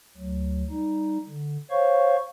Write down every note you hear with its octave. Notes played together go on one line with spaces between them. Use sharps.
D2 F#3
G3 D#4
D3
C5 C#5 F5 C#6